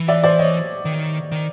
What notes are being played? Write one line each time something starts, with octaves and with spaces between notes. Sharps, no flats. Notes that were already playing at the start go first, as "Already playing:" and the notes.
Already playing: E3
D5 E5
C5 D5
C#5 D#5
D#3
D#3